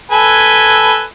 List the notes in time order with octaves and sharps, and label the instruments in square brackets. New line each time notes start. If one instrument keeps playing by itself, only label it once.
[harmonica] A4 B4 G#5